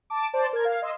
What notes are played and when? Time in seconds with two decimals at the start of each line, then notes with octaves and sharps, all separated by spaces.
0.10 A5 D6
0.33 C5 D5 A5
0.53 A#4 G#6
0.65 F5
0.82 D#5 C6 E6